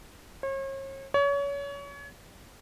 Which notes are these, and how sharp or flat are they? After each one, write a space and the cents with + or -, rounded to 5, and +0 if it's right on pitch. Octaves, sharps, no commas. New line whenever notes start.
C#5 -40
C#5 +30